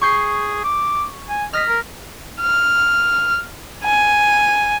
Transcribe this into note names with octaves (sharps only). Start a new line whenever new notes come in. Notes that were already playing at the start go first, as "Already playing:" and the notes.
G#4 C#6 G6 C7
D6
G#5
D#5 F6 A#6 B6
A#4
F6
G#5